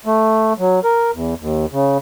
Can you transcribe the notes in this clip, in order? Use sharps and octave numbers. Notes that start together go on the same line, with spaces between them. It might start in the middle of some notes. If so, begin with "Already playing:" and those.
A3
F#3
A#4
E2
D#2
C#3